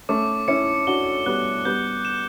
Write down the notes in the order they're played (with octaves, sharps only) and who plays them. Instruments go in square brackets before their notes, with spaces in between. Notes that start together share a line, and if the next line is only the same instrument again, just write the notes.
[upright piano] A3 C#4 [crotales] D6
[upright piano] C#4 E4 [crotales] C#7
[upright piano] D4 F#4 [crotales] G7
[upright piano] G3 B3 [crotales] F#6
[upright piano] G3 B3 [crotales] G6
[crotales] E7